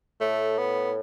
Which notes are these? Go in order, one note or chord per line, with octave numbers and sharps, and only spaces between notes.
A2 A3
B3